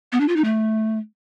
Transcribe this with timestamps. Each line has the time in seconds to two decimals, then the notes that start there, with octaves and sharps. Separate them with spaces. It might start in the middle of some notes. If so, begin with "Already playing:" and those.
0.12 B3
0.20 D4
0.28 F4
0.36 D#4
0.44 A3